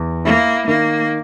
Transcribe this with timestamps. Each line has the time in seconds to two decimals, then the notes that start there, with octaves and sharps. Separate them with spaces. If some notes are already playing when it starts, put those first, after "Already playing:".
Already playing: E2
0.25 A#3 E4
0.67 D#3 A#3